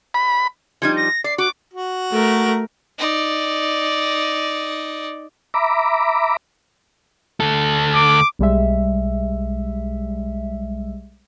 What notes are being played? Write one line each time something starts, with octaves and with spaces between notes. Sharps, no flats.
B5
F3 G3 D#4 G#6
A#6
D5 C7
F#4 D6
F#4
A3 A#4
D#4 D5
E5 A#5 B5 D6
D2 A4
D6
B1 G3 G#3 E5